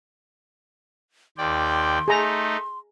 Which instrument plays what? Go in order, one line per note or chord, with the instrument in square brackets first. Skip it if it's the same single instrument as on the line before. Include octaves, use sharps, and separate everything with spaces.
[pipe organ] D#2 D5 G5 [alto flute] C6
[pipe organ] A3 D#4 [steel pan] G#4 A#5